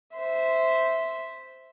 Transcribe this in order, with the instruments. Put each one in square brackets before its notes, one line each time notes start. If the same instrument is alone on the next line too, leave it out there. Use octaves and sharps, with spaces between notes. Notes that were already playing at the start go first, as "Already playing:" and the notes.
[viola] C5 E5